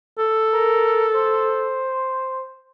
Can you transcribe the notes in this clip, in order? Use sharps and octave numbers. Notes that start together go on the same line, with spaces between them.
A4
A#4
C5